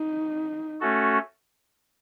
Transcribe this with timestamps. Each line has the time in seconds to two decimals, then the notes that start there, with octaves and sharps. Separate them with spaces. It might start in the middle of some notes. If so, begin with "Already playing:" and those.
Already playing: D#4
0.81 A3 C#4 F#4 A4